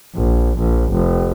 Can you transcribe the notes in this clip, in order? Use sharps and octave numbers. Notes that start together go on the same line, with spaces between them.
A#1
A#1
F1